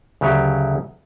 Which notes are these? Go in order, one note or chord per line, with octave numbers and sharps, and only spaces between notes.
D2 C#3 F#3 G4 C#5